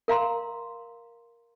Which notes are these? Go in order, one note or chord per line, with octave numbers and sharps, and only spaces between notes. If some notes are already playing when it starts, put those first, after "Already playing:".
A#4 F5 A#5 C6